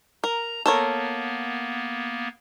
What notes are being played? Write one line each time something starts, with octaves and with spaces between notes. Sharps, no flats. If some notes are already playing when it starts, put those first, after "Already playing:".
A#4 A#5
A#3 B3 A4 A#4 C#5